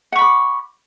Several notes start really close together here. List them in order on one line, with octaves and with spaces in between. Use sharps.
F#5 C#6 B5 D6